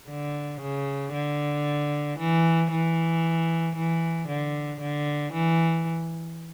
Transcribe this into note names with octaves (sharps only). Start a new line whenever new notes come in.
D3
C#3
D3
E3
E3
E3
D3
D3
E3